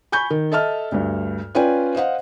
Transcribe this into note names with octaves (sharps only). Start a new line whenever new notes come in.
G#5 B5 C#6 G6
D#3
A4 D#5 E5 A5 F6
D2 G2
C#4 F4 B4 D5 G5 G#5
C5 D#5 F5 F#5